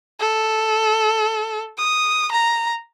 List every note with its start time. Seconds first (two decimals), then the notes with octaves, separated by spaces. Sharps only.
0.20 A4
1.78 D#6
2.32 A#5